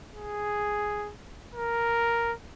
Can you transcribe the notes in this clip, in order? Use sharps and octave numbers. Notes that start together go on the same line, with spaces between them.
G#4
A#4